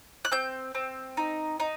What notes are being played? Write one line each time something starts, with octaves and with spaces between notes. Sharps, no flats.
F#6
C4 G6
C4
D#4
D#4